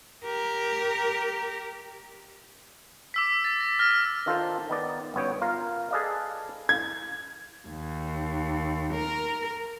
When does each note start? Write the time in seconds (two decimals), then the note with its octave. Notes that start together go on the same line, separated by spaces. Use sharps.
0.24 G4 A#4
3.14 D6 E6 B6
3.26 B6
3.44 A6
3.61 A#6
3.79 F6 A#6
4.26 D#3 D4 F4 A4 A#4 C5
4.69 D#3 B3 D5
5.14 G1 F#2 B3 C#5 G5
5.41 F4 A#4 F5
5.91 G#4 A4 B4 D5 D#5 F5
6.69 G#6
7.68 D#2
8.94 A#4